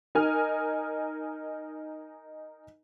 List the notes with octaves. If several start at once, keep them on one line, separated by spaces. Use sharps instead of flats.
D#4 A#4 D#5 G#5 F6